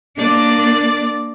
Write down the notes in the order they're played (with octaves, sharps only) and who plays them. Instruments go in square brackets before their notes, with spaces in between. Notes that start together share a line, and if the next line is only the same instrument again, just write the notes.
[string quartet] A#3 D4 D5 D6 A6